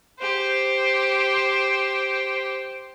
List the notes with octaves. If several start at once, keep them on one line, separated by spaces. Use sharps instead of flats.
G4 C5